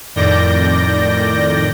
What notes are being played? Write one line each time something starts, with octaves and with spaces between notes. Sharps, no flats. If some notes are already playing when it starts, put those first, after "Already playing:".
F2 A2 D#3 D5 G6 A#6